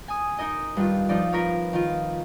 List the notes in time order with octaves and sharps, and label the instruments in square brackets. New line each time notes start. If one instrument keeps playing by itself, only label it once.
[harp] G#5 D#6
D#4 A#4 D#5
G2 D#3 F4
F3 D#4 F4 D5
C4 F4 A#4 B4 C#5 F5
D#3 F4